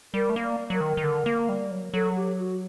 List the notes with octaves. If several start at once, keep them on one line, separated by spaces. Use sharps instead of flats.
G3 A#4
A3
A#3
D5
F#3 A#4
D#3
D#3
D3
A#3
G3
F#3
F#3 A4
G4
F#4